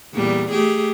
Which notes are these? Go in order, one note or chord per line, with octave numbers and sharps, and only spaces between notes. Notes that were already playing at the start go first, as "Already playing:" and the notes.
E2 A#2 G3
A3 G4 G#4